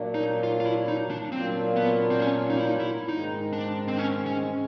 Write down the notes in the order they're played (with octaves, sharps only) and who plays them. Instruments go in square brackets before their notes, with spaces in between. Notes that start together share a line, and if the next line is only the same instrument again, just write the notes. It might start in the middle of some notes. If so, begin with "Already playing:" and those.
Already playing: [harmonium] A#2 F#3 A#3 D4
[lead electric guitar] D#4
F4
F4
E4
D#4
D4
[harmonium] A#2 F#3 A#3 D4 F4 [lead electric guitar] C4
[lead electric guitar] B3
C4
C#4
D#4
E4
D#4
E4
[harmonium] G#2 D#3 G#3 [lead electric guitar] D#4
[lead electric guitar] D4
C4
C#4
C#4